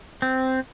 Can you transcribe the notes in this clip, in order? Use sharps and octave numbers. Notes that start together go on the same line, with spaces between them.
C4